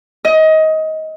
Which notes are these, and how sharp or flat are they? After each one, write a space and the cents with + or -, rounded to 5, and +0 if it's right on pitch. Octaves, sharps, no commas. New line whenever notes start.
D#5 +20